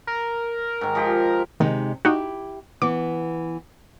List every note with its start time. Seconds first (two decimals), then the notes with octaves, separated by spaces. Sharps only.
0.07 A#4
0.81 G#2 D#3
0.95 F3 G#3 G4
1.60 C3 D#3 G#3 D#4
2.05 D#4 E4 F#4 G4
2.82 E3 B3 D6